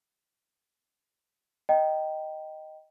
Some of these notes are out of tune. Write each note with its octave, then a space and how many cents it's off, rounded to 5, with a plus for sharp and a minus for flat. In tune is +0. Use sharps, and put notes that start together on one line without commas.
D#5 +0 G5 -10 A#5 +0